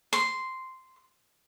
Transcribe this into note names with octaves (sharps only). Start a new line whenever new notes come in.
C6